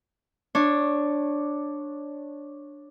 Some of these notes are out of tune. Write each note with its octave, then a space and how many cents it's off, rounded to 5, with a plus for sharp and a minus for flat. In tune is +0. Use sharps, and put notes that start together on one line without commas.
D4 +0 C#5 -15